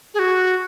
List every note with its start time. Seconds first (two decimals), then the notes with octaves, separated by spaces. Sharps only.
0.14 G#4
0.19 F#4